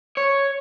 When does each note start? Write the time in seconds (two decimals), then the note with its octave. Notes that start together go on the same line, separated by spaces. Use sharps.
0.17 C#5